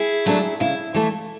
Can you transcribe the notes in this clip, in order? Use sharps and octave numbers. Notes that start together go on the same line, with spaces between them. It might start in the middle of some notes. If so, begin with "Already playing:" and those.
Already playing: E4 G#4
F#3 A3 D4
C#3 E4
E3 A3 E4